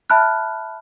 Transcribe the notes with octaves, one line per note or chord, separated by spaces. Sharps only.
E5 A5 B5 F6 F#6